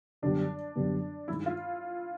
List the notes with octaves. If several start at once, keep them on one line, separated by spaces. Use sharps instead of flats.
F#2 D3 G3 B3 D4
F#2 D3 G3 B3
G2 D#3 G#3 E4
F4